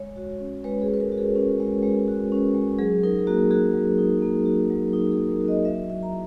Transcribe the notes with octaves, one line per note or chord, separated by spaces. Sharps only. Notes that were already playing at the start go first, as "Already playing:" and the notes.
Already playing: G#3 C#5
F#4
C#4
G#3 B4
G#4
G#3
B4
A#4
F#4
G#4
C#4
G#3
G#3
F#4
C#4
G#3
F#3 G#4
D#4 A#4
G#4
A#3 F#4
F#4 G#4
F#3
D#4
A#3
F#4
F#3
D#4
G#4
A#3
A#4
F#4
D#5
F#3 E5
E4 E5
A#5